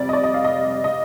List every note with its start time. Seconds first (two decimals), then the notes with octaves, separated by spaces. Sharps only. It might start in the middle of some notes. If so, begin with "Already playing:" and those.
Already playing: F2 C3 G3 D5
0.09 D#5
0.13 D5
0.24 D#5
0.34 F5
0.44 D#5
0.84 D#5